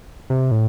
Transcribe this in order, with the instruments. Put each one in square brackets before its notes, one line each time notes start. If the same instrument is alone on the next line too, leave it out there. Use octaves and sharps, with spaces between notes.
[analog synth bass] C3
A2